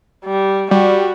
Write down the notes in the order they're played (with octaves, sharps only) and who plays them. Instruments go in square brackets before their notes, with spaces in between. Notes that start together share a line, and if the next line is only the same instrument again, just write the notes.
[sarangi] G3
[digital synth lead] G3 [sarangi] F#4